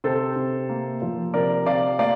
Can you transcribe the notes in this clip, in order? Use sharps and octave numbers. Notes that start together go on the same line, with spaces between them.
C3 A4 C5
C3
A#3
F3
C3 A#4 D5
C3 D5 F5
A#3 D5 F5